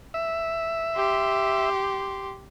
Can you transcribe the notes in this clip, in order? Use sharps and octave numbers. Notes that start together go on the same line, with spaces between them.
E5
G4 C6